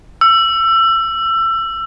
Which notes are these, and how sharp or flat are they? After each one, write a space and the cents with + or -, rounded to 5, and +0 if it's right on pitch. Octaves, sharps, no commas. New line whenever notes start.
E6 +25